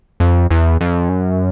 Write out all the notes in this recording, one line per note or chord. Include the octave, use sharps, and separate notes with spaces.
F2
E2
F2
F#2